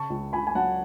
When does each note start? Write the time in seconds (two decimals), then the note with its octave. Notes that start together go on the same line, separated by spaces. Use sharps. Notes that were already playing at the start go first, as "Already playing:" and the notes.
Already playing: C#3 A5 C#6
0.10 C#2
0.33 C#2 G#5 B5
0.47 G#5
0.55 F#3 F#5 A5